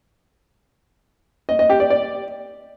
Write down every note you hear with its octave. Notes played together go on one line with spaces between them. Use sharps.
D#5
D#5
G4
D5
D5